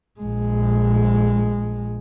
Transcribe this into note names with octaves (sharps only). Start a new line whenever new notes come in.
A#1 G#3